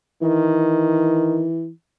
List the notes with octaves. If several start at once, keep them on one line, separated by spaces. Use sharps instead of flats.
D#3 E3